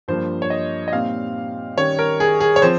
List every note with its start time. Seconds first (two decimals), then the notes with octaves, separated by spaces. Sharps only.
0.08 G2 F3 A#3 C5
0.42 C#5
0.50 D#5
0.88 D#5
0.92 A#2 G3 C4 D#4 F5
1.77 D#3 G3 C#4 C#5
1.99 A#4
2.20 G#4
2.41 G#4
2.56 C#5
2.62 F3 C4 C5